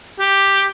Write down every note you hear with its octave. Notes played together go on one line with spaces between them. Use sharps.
G4